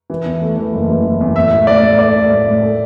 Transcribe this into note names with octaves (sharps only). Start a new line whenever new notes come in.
E3
E2
A3
E3
F#1
E3
E3
E2
A1 E5
A1
A2 D5
A2
A3 D5
A2
A2
A2
A4